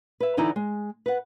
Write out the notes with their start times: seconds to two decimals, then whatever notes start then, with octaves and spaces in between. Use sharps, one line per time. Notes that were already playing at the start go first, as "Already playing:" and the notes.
0.20 B4 E5
0.37 D3 E3 D#4 E4 D5
0.56 G#3
1.06 B4 F#5